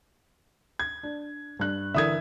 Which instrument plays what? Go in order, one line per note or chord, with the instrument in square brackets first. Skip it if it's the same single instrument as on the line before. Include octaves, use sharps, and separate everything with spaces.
[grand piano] G#6
[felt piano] D4
G2 F#6
[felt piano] D3 E3 A#4 [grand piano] E5 D#6 G#6